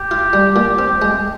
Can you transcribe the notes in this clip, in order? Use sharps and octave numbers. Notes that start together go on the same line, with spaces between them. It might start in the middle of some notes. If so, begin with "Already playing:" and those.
Already playing: G4
F4
G3
A#2
C4
G#3